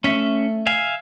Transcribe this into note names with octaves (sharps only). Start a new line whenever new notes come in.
A3 C#4 E5
E5 F5 G#5